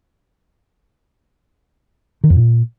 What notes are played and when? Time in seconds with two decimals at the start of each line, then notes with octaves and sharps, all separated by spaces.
2.24 D#3
2.30 F2
2.36 A#2